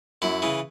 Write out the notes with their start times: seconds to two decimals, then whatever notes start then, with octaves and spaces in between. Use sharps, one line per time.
0.22 F#2 E4
0.42 C#3 E3